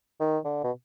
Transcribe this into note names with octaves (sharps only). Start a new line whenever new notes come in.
D#3
D3
B2